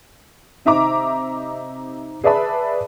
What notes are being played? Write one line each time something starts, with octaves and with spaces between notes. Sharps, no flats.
C3 D#4 E5 A#5 D6
G#4 B4 D5 E5 A5 B5